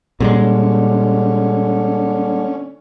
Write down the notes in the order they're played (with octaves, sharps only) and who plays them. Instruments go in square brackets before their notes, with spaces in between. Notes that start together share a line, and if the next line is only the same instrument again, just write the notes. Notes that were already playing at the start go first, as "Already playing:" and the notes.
[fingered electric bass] A#2 G3 G#3 [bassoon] D3 [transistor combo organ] C#4